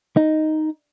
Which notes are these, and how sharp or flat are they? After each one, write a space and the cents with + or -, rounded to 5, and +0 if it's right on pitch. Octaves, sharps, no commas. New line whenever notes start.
D#4 +0